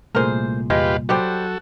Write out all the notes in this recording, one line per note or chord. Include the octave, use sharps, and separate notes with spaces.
C2 A#2 A3 G#4 A#4 C5
E2 G#3 F4 G4 B4
F#3 G3 F#4 G4 A4 C5